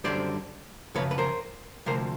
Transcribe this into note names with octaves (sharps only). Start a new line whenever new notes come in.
F#2 D3 G3 C5 D5
F#2 C#3 F3 B4 C#5
B4
A#4 C5
D2 C3 F3 A#4 C5